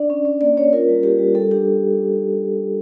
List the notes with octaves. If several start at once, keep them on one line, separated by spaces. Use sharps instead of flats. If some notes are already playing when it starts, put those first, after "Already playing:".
Already playing: D4 D5
C#4
C#4
A#3 D5
C#4 C#5
F4 A#4
G3
F4 G4
G3
G3 A4
D4 G4